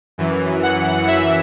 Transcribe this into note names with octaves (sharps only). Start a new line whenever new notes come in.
F#2 E3
F#5
F#2 E3 E5